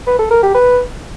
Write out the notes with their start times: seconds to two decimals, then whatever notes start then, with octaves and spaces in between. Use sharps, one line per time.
0.07 B4
0.19 A4
0.31 A#4
0.43 G4
0.55 B4